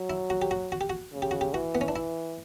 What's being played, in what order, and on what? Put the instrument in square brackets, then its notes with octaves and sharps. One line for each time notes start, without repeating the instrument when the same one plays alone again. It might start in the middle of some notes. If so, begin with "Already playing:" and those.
Already playing: [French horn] F#3
[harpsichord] E4
F#4
G4
F#4
F#4
G4
F#4
[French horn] C#3
[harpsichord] G4
F#4
G4
[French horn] E3 [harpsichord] F#4
[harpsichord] B3
C#4
D4
E4